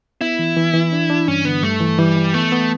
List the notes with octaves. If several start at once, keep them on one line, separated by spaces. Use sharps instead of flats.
B3 E4
E3
E3
E3
D4
D4
G2 C#4
D3 B3
G2 A3
E3
E3 G3
E3
A3 B3
B3